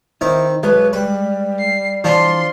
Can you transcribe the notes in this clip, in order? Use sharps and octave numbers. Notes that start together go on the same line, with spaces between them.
D#3 C4 D#4 E4
B1 G#3 B4
G3 B4
C7
E3 F3 D4 F4 C6